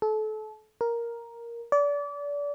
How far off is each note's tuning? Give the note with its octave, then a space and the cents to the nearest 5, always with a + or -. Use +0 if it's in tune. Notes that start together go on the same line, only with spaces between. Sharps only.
A4 -30
A#4 +5
D5 -30